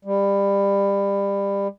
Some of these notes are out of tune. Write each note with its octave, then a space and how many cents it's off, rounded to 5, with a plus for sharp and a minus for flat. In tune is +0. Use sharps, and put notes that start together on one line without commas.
G3 +25